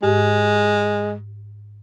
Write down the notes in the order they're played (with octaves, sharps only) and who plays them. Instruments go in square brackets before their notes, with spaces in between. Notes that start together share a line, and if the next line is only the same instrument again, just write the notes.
[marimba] G#2 G4 [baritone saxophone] G#3